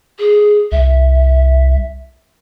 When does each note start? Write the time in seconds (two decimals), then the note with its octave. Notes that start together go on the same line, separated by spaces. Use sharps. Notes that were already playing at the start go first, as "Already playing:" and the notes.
0.19 G#4
0.72 C2 E5